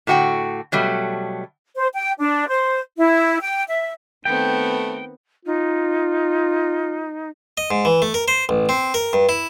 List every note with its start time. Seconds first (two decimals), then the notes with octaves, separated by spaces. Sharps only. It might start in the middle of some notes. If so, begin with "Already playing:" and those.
0.07 A2 D3 F#4 F#5 G5
0.72 B2 F#3 G3 A3
1.76 C5
1.95 G5
2.19 D4
2.48 C5
2.98 E4
3.41 G5
3.69 E5
4.25 D#3 A3 B3 C4 G5
5.45 D#4 F4
7.57 D#5
7.71 G#2
7.85 E3
8.02 A3
8.14 A#4
8.28 C5
8.49 A1
8.69 C4
8.94 A#4
9.13 G2
9.29 E4